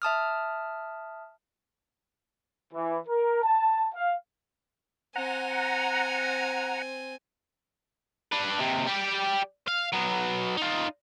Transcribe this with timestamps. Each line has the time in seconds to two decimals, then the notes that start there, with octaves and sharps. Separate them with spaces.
0.02 E5 A5 D#6 F6
2.74 E3
3.07 A#4
3.42 A5
3.94 F5
5.16 C4 F#5 G#5 A#5
8.32 D4 B4
8.58 D#2 C3
8.86 G3 G4
9.68 F5
9.92 F#3 B3
10.57 D#4 F4